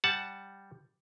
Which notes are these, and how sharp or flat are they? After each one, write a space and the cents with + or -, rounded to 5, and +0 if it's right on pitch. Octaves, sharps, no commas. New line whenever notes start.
G3 +0 F#5 +0 A5 -10